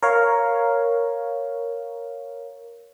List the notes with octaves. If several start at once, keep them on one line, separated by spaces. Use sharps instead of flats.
A#4 C#5 F5